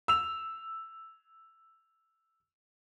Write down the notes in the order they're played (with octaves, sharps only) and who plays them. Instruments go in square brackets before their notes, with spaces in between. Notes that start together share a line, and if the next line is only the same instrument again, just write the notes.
[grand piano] E6 F7